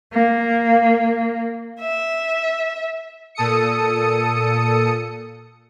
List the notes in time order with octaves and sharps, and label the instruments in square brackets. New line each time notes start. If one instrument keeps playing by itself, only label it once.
[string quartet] A#3
E5
[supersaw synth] A#2 A4 D#6 C#7